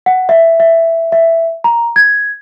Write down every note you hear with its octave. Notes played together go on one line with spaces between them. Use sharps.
F#5
E5
E5
E5
A#5
G#6